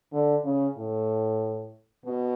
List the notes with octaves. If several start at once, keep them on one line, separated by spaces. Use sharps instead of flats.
D3
C#3
A2
B2